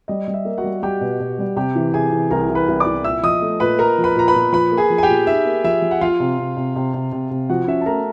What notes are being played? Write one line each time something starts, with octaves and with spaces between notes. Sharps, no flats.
G3 D#5
G3
E5
A#3
F#4 F#5
G3
G3 G4 G5
B2
B2
G3
C3 G4 G5
E3
C3 G#4 G#5
E3
C2 A#4 A#5
E3
B4 B5
C2
D5 D6
C2
A#2 E5 E6
F3 D#5 D#6
A3
A#2 B4 B5
A#2 A#4 A#5
F3
B4 B5
A#2 A#5
B4 B5
A#2
F3 B4 B5
A#3
G#4 G#5
F3
G#5
G4 G5
A#2
D#4 E5
A#3
F3 E5
F3
F#5
F3 F4 F5
C3
C3
C3
C3
C3
C3
C3
F3 F#4 F#5
C#4 E5
A5
A3 A#4 A#5